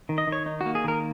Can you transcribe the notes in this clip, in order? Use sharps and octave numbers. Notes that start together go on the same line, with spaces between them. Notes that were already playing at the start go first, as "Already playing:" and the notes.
D#3
D#5
D#3 C#5
D#4
F#4
A#3
G#4
D#3 A#4